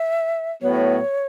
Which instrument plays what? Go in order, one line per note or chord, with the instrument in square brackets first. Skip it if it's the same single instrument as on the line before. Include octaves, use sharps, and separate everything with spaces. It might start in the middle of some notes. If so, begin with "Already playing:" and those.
Already playing: [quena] E5
[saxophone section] A2 F#3 B3 [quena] C#5